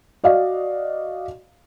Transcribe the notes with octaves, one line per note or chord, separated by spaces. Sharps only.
F#4 D5 D#5 F5